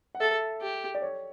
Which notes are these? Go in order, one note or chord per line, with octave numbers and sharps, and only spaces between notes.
F#5
A4 E5
G4
D5
C#5